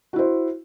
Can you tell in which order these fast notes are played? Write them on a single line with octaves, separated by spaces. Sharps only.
F#4 E4 C5